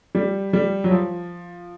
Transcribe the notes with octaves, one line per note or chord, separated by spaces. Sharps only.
G3
G3
F#3
F3